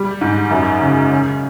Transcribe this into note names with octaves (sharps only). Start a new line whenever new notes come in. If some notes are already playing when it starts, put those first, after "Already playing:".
Already playing: G3
G#2
F#2
C#3
C#3